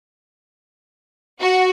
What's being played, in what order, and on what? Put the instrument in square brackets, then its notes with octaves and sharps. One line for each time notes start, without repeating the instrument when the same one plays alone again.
[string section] F#4